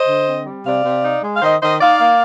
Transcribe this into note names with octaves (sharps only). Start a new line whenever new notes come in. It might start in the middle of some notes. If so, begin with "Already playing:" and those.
Already playing: C5 D#5
D3
C4
G3
C3 D5 F5
C3
D#4
G#3
F5
D#3 C5 D#5
D#3 C5 D#5
D#4 D5 F5
A#3